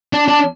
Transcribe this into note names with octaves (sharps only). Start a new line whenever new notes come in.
D4
D4